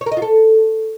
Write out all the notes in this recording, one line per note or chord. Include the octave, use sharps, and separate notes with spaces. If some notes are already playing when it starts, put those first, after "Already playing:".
C#5
A#4
D#5
F4
A4